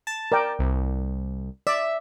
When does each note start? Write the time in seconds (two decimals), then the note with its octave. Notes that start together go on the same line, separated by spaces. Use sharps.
0.07 A5
0.32 A#4 D5 G5
0.59 C2
1.67 D5 E5